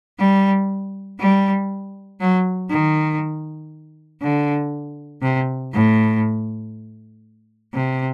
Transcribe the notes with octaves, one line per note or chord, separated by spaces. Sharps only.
G3
G3
F#3
D#3
D3
C3
A2
C3